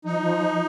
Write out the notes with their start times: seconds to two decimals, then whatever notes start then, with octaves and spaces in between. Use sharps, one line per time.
0.05 F3 D#4
0.22 F3